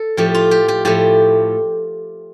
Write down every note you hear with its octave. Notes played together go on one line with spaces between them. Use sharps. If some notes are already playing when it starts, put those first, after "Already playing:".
Already playing: A4
A2 F3 A3 G4
F4
G4
G4
A2 F3 A3 G4